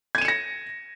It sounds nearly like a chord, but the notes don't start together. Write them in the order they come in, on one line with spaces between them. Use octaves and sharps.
G#6 D#7 E7 C#7 A#6